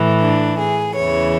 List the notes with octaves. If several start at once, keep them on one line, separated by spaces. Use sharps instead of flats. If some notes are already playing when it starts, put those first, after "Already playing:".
Already playing: A2 E3
D4
G#4
E2 C#3 E3 C#5